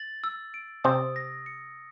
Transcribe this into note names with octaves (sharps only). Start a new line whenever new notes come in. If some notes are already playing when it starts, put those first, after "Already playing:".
Already playing: A6 F#7
E6
D7
C3 C4 D#6
A#6
C#7